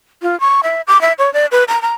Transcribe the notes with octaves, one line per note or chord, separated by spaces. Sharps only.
F4
C#6
E5
D6
E5
C#5
D5
B4
A#5
A#5